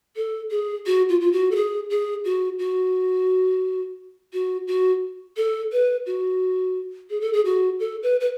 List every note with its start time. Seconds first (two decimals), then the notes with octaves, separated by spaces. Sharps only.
0.16 A4
0.51 G#4
0.86 F#4
1.09 F4
1.21 F4
1.32 F#4
1.51 A4
1.56 G#4
1.90 G#4
2.25 F#4
2.59 F#4
4.33 F#4
4.67 F#4
5.37 A4
5.72 B4
6.06 F#4
7.10 G#4
7.21 A4
7.33 G#4
7.45 F#4
7.80 A4
8.03 B4
8.20 B4